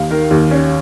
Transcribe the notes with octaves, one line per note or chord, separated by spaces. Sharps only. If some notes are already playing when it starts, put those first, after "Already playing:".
Already playing: D#2 F5
D#3 A#4
D#2
C#4